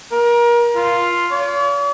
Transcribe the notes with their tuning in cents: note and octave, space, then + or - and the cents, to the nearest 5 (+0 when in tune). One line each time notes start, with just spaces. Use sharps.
A#4 +30
F4 +0
C#5 +45